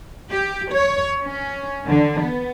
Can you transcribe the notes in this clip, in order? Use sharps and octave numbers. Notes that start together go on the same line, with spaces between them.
G4
C#5
C#4
D3
B3